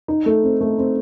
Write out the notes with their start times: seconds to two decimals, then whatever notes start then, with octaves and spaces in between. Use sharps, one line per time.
0.08 D#4
0.26 A3
0.44 C4
0.61 A3
0.78 C4